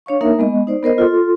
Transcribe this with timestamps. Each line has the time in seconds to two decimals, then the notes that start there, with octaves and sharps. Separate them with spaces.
0.06 D4 C#5 F5 C#6
0.21 A#3 D#4 A#4 E5
0.39 G#3 B3 D#5
0.67 D#4 C5 D5
0.83 B3 A#4 C5 D#5
0.98 F4 A4 C6